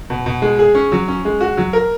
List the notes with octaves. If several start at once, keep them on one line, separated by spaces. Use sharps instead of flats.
B2
B2
G#3
G#4
C#4
F#3
C#4
G#3
F#4
F#3
A#4